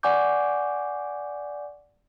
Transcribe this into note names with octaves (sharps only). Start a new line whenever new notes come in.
D5 F#5 G#5 C#6 D6 G6